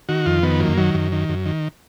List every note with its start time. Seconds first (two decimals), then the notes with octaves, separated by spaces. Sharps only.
0.09 D#3 F#4
0.26 F2 F4
0.43 D#3 B3
0.60 F#2 A#3
0.78 D#3 F#3
0.94 F#2
1.12 D#3
1.29 F#2
1.46 D#3